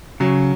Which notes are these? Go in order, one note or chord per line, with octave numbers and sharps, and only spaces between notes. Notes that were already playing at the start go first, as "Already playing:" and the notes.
C#3 F#3